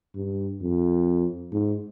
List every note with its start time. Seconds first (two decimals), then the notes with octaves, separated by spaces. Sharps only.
0.15 G2
0.62 F2
1.53 G#2